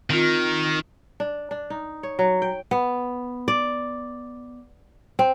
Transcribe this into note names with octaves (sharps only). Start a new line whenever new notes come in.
D#3 C4 F4
D4
D4
D#4
C#5
F#3
G5
B3
D5
C4